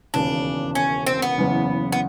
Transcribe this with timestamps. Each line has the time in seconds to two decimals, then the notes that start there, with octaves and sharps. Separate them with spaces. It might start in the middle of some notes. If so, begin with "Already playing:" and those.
0.14 E1 D#2 C#3 D4
0.75 C#4
1.07 C4
1.22 B3
1.38 F#1 E2 C#3
1.92 B3